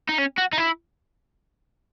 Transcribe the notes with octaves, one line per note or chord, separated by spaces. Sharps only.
D#4
C#4
F#4
D#4
E4